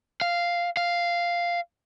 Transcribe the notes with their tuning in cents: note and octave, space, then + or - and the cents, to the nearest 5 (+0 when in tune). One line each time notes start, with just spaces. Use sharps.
F5 -5
F5 -5